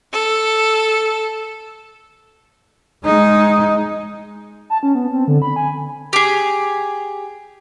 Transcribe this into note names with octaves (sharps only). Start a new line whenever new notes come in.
A4
G#3 D#4
A5
C#4
B3
C4
D3
B5
G#5
G4 G#4